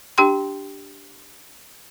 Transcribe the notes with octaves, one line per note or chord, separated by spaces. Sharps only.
D4 G4 G5 C6